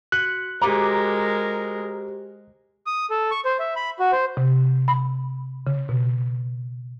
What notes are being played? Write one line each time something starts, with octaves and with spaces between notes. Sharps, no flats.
F#4 F#6 C#7 F#7
G#3 F#4 G4 A#4 C5 A#5 D6
D#6
A4
C#6
C5
E5
B5
F#4
C5
C3
B5
C#3
B2